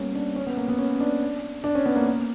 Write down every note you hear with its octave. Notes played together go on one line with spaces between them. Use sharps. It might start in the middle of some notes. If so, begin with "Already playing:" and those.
Already playing: G3 A#3 B3 C#4
D4
C#4
B3
A#3
B3
C#4
D4
D4
C#4
B3
A#3
A#3